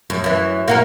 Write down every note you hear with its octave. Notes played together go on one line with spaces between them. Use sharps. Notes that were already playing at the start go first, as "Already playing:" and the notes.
F#2
F#2 E3
A#3 F#4 A#4